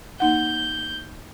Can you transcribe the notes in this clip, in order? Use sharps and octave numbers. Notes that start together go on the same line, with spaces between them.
A#3 D#4 F#5 G6